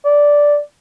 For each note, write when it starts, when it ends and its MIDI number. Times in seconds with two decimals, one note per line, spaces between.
0.05 0.58 74